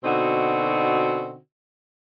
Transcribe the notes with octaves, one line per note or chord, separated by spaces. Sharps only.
B2 D3 C4 D#4 F#4